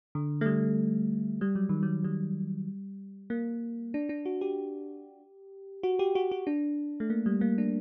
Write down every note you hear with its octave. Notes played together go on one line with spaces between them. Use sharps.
D3
A3
G3
G3
F#3
D#3
F#3
G3
A#3
D4
D4
F#4
G4
F#4
G4
F#4
F#4
D4
A3
A#3
G3
A#3
D4